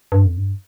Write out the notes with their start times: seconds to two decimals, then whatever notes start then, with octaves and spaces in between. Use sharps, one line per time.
0.12 G2
0.25 F2
0.37 G2